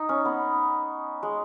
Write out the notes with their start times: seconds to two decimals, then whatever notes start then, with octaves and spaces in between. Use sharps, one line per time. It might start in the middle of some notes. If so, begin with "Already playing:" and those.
Already playing: D#4
0.09 C#4
0.25 B3
1.23 G#3